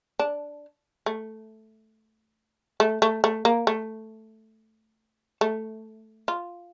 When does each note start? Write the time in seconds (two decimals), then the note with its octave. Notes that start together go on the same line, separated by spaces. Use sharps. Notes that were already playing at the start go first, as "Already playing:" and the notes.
0.19 D4
1.06 A3
2.80 A3
3.02 A3
3.24 A3
3.45 A#3
3.67 A3
5.41 A3
6.28 F4